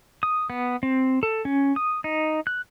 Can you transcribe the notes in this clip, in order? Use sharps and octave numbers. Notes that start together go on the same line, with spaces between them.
D#6
B3
C4
A4
C#4
D#6
D#4
F#6